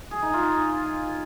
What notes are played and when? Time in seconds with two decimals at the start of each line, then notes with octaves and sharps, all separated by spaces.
0.11 G#4
0.22 D#4
0.33 F4